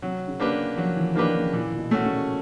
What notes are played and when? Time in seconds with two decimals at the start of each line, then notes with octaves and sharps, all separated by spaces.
0.02 C3 F#3
0.27 C#3
0.40 A#3 D4 G4 B4
0.77 F3 F#3
0.97 E3
1.15 D#3 A#3 D4 G4 B4
1.35 C#3
1.53 A#2 E3
1.71 A#2
1.78 B2
1.91 A3 C#4 F#4
2.04 C#3